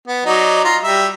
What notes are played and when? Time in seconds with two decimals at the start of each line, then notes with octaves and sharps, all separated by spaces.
0.08 B3
0.25 F#3 D#4 D5
0.65 F4 A#5
0.83 G3 E5